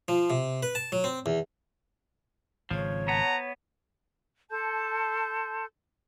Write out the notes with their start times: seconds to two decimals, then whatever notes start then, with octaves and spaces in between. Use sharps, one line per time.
0.08 F3
0.30 C3
0.63 B4
0.75 A5
0.92 F#3
1.04 C4
1.26 E2
2.71 G#1 C#3 F3 C#5
3.08 B3 F#5 A5 A#5
4.51 A4 A5 C6 G6